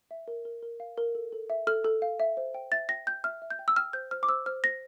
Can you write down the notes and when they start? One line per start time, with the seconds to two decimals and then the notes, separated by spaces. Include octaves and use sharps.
0.11 E5
0.28 A#4
0.45 A#4
0.62 A#4
0.80 F5
0.97 A#4
1.15 A4
1.33 A4
1.50 E5
1.67 A4 F6
1.85 A4
2.02 F5
2.20 E5
2.37 C5
2.54 G5
2.72 E5 A6
2.89 G5 A#6
3.07 G5 G6
3.24 E5 F6
3.42 E5
3.50 G6
3.59 G5
3.68 E6
3.76 G5 F6
3.93 C5 G6
4.11 C5 F6
4.23 D6
4.29 C5 E6
4.46 C5 F6
4.64 C5 A#6